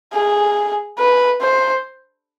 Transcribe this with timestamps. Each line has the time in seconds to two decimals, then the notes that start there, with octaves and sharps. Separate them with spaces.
0.13 G#4
0.99 B4
1.41 C5